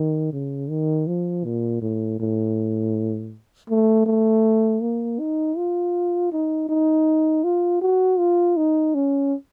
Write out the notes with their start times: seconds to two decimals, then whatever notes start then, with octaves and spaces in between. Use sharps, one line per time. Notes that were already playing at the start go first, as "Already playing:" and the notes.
Already playing: D#3
0.32 C#3
0.69 D#3
1.07 F3
1.44 A#2
1.81 A2
2.20 A2
3.70 A3
4.06 A3
4.82 A#3
5.20 D#4
5.57 F4
6.32 D#4
6.69 D#4
7.44 F4
7.81 F#4
8.18 F4
8.57 D#4
8.94 C#4